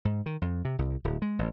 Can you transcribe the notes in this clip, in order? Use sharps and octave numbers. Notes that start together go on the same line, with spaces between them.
G#2
D#3
F2
C3
C2
D1
G#3
A1